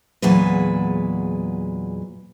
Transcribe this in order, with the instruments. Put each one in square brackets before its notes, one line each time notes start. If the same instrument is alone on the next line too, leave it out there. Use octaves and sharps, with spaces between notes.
[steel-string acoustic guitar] E2 A#2 F#3 G#3 B4